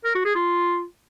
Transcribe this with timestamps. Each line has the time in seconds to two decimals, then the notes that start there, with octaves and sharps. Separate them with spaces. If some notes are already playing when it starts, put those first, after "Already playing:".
0.05 A#4
0.15 F#4
0.25 G#4
0.35 F4